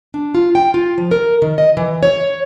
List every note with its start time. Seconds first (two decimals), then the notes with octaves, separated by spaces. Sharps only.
0.14 D4
0.35 F4
0.55 G5
0.74 F4
0.98 F3
1.11 A#4
1.42 D#3
1.58 D#5
1.77 E3
2.03 C#5